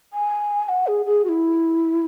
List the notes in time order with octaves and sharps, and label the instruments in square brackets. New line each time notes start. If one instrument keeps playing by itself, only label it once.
[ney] G#5
F#5
G#4
G#4
F#4
E4